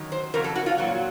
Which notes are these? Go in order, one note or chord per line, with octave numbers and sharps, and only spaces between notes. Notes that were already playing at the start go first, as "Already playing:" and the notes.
Already playing: F#2 D#3 F#3
C5
F2 C#3 F#3 A#4
A4
F#4
F4
A#2 F#3